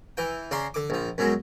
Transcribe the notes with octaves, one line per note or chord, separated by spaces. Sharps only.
E3 G5
C#3 D4 A#5 C6
D3 D6
A#1 F3
F#2 B2 F#3 G#3